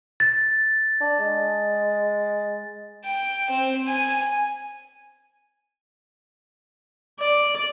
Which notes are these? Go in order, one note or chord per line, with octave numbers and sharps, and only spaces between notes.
A6
D4
G#3
G5
C4
G#5
D5